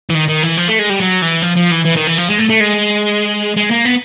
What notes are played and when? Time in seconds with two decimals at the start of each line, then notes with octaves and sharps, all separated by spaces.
0.10 E3
0.15 D#3
0.28 D#3
0.43 E3
0.57 F3
0.68 A3
0.79 G#3
0.90 G3
1.00 F#3
1.22 E3
1.42 F3
1.56 F3
1.72 E3
1.85 E3
1.97 D#3
2.07 E3
2.18 F3
2.29 G#3
2.39 A3
2.50 A3
2.60 G#3
3.57 G#3
3.71 A#3
3.85 B3